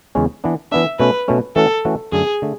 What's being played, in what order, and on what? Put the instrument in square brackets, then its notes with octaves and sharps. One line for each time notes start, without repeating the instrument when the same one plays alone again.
[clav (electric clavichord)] E2 C#3 G#3 C#4
E3 B3 D4
[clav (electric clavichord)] E3 B3 D4 [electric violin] E5
[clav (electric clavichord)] B2 A3 C#4 [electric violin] B4
[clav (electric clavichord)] B2 A3 C#4
[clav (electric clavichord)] E3 A3 C#4 F#4 [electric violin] A4
[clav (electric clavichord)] E3 A3 C#4 F#4
[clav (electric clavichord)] F#2 D3 A3 [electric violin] G#4
[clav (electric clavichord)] D3 A3